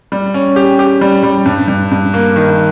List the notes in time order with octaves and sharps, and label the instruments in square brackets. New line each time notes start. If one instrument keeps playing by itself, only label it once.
[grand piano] G3
C#4
G4
G4
G3
G3
G2
G2
G2
A#3
D#3